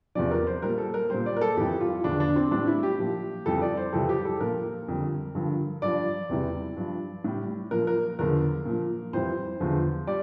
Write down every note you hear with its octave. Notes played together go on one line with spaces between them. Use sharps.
E2 C3 F3 D5
A#4
C5
A#2 G3 A#4
A4
A#4
A#2 G3 C5
D5
A#4
A4
F2 E3 G3 G4
F4
E2 D3 F3 D4
D4
C4
A2 E3 G3 D4
E4
G4
A#2 F3
F2 E3 G3 A4
D5
C5
F2 C3 E3 G3 A4
G4
A4
A#2 F3 A#4
F2 D3 G3
G2 D3 F3
G2 F3 D5
E2 C3 E3 G3
G2 F3
A2 G3
A#2 F3 A#4
A#4
E2 D3 F3 A#4
A#2 F3
F2 E3 G3 C5
E2 D3 F3
G3 D5